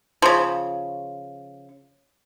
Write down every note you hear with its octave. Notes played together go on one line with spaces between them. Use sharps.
C#3 F3